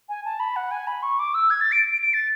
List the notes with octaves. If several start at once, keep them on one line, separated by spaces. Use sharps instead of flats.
G#5
A5
B5
F#5
G#5
B5
C#6
D6
E6
G#6
A6
D7
D7
D7
A6